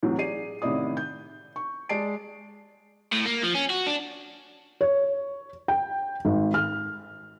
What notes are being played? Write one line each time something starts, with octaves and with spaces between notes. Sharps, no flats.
C2 A2 E3 F#3
G#4 D5 C7 D#7
A1 C3 D#3 E4 D5 D#6
G6
C#6
G#3 D5 A5 C7 D7
A2
A#3
F3
C#4
F#4
D4
C#5
G5
G#1
F6